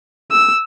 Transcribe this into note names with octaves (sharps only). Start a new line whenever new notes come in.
E6